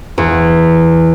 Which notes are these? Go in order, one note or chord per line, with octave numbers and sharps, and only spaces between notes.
E2